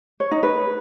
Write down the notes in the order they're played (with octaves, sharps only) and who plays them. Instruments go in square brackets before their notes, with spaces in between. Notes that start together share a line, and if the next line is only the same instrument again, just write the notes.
[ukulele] C#5
D#4
B4